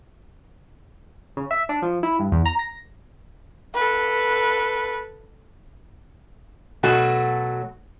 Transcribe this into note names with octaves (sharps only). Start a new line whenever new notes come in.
C#3
E5
D4
F3
E4
G2
E2
A#5
A#6
A4 B4
B2 F#3 A3 F#4